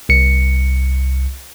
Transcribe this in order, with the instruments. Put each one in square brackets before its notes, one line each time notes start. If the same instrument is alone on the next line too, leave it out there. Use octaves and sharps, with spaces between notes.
[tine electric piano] C2 C#7